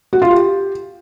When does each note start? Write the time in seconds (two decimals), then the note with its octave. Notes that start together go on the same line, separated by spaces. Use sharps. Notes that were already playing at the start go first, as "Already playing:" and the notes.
0.13 F#4
0.22 F4
0.31 G4